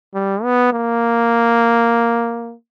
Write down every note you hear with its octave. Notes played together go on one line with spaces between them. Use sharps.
G3
B3
A#3